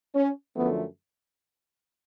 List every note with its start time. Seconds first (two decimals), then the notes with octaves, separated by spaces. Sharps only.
0.14 C#4
0.55 F#2 D3 F3 A3 B3